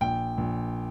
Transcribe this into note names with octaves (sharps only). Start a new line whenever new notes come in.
A#1 G5
A#1